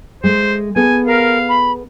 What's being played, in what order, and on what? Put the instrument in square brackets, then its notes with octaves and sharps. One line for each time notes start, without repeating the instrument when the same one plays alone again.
[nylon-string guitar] G#3 A3 [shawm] C5
[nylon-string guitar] B3 G#4 A4 [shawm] G#5
[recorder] A#4 [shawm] F5
[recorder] B5